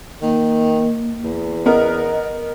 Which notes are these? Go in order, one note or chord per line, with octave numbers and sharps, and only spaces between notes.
D#3 A#3
E2
B3 A#4 D#5